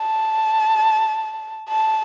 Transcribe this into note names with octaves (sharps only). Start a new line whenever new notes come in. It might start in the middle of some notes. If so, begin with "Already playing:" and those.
Already playing: A5
A5